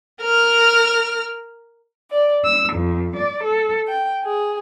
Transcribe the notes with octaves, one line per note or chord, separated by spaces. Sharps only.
A#4 F6
D5
E6
F2
D5
A4
G5
G#4